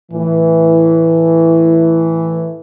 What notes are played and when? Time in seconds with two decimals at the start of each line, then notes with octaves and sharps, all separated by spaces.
0.12 A2 E3